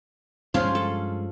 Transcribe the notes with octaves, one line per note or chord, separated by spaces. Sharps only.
G2 F3 G#3 C#4 F4
A4